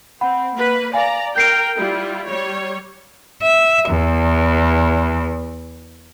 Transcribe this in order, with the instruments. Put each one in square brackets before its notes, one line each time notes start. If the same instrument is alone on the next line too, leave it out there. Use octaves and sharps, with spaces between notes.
[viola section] C4 [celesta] F#5 B5
[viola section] A#3 B4
[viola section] D5 A#5 [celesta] F5 G#5
[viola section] A#4 G5 [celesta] G6 C7 D7
[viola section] G3 E4 F4
G3 C#5
[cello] E5
E2